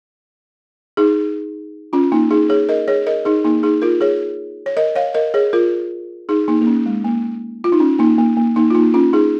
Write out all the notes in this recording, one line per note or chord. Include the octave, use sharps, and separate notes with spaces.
D#4 G#4
C#4 F4
A#3 D#4
D#4 G#4
G#4 C#5
A#4 D#5
G#4 C#5
A#4 D#5
D#4 G#4
A#3 D#4
D#4 G#4
F4 A#4
G#4 C#5
C#5
A#4 D#5
C#5 F5
A#4 D#5
G#4 C#5
F4 A#4
D#4 G#4
A#3 D#4
A#3
C#4
G#3
A#3
F4
D#4
C#4
A#3 D#4
A#3
A#3
A#3 D#4
F4
A#3 D#4
C#4 F4
D#4 G#4